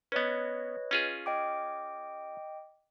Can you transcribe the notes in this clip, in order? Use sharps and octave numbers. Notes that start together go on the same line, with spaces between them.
B3 C#4 B4 C#5 D#5
C#4 F4 G#4
D#5 G5 D6